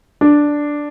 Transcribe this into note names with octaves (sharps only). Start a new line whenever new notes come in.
D4